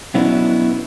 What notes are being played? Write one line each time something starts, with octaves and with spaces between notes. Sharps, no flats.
B2 F#3 B3 C#4 D4 E4